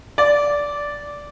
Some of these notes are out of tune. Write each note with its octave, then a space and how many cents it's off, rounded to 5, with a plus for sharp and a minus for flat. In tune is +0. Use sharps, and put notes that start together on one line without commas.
D5 -10